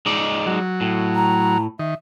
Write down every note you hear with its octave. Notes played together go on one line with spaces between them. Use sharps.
G#3 D#4 D5
F#3
A2
A#5
D#3 E5